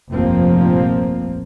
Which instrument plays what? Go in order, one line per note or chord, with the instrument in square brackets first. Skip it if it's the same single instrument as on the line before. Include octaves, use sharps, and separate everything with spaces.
[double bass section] F1 A#1 G2 F3 A#3 C4